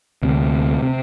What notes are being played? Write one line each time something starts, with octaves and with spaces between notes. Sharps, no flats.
D2 C3
C3